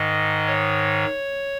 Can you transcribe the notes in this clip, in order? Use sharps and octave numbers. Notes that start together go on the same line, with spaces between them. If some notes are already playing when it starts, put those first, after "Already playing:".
Already playing: G#2 D#3 D#5
C#5